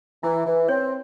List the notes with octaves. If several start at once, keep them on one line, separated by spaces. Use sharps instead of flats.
E3 E4
E3
C4 C#5